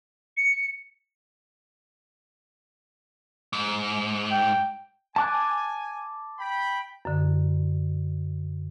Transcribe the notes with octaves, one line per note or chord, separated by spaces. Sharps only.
C#7
G#2
G5
G#5 A5 D6 F#6
G5 B5
F#2 D3